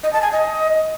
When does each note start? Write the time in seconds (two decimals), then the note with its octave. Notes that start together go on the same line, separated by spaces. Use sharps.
0.03 D#5
0.13 A5
0.22 G#5
0.32 D#5